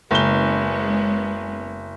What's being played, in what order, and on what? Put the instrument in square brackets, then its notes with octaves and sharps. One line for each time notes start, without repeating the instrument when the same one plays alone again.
[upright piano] F#1 G7 [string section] G#3 B3 C#4